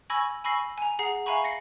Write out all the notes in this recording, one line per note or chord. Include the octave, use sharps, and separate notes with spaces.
G#5 B5 C#6 E6 G#6 A#6
G#5 B5 C#6 E6 A#6 C7
G#5 A#5
G#4 F#5 A#5 C7
E5 F5 G#5 A#5 B5 C#6
A#6 C7 C#7